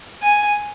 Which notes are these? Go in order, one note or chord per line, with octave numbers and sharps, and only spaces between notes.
G#5